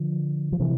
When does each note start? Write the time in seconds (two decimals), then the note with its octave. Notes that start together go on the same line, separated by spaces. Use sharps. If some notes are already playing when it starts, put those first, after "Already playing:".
Already playing: D3 F3
0.52 F3
0.60 C3 E3